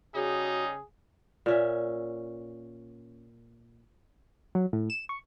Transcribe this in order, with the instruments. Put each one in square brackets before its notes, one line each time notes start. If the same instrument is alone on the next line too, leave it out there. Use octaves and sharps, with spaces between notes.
[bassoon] C#3 [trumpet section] G3 D#4 [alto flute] F#4 [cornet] G#4
[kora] A#2 C#4 E5
[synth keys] F#3
A2
E7
C#6